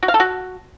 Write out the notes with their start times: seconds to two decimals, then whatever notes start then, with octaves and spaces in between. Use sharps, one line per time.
0.03 F#4
0.08 F5
0.14 A4
0.20 F#4